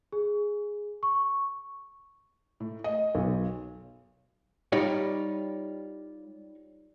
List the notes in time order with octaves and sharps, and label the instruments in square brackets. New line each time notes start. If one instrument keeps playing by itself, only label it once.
[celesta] G#4
C#6
[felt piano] A2
D#5
B1
[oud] G3 [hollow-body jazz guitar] D#4 F4 C#5